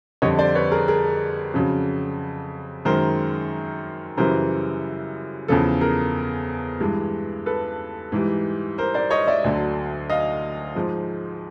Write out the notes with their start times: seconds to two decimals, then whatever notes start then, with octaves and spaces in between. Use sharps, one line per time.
0.22 F2 D3 G3 C#5 D#5
0.38 C5 D5
0.55 B4 C#5
0.71 G#4 A#4
0.88 G#4 A#4
1.54 F2 C#3 F#3
2.85 F#2 D#3 G#3 A#4 C5
4.17 F#2 C#3 E3 G3 A#4 C5
5.48 E2 C#3 F3 A4
5.81 G#4 A#4
6.80 G2 E3 G#3
7.46 A4 B4
8.12 G#2 E3 G3
8.78 A#4 C5
8.94 C5 D5
9.11 C#5 D#5
9.27 D5 E5
9.44 D2 D3 F#3
10.10 D#5 F5
10.75 G#2 F3 G#3